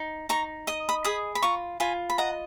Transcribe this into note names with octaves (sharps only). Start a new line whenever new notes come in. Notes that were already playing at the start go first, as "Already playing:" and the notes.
Already playing: D#4
D#4 A#5 C#6
D#5 D#6
B5 D#6
G#4 B5 D#6
B5
F4 A#5 C#6
F4 G#5 B5
B5
D#5 F#5 A#5